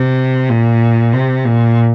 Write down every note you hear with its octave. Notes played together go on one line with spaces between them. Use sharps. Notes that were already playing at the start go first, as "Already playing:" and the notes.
Already playing: C3
A#2
C3
A#2